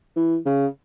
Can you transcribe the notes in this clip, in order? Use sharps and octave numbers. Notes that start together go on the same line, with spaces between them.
E3
C#3